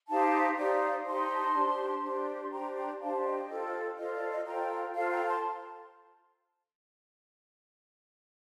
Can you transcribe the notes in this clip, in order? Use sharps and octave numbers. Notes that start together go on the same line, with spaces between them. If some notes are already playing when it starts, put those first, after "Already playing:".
D#4 G4 C5 F5 A5
D#4 G4 C5 D5 F5
D#4 G4 C5 A5 C6
D4 G4 C5
D4 G4 C5
C6
D4 G4 C5 G5 A#5
G5 A#5
D4 G4 C5 F5 A5
D#5 G5
F4 A4 C5
F4 A4 C5 D#5
D5
D#5
F4 A4 C5 G5 A#5
F4 A4 C5 F5 A5
G5 A#5
A5 C6